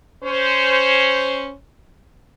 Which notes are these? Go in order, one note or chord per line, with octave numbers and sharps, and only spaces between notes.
C#4 C5